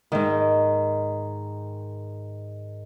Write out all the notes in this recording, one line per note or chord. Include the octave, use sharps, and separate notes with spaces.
G#2 D#3